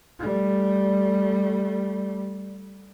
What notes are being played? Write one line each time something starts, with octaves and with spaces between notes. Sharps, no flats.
G3 A3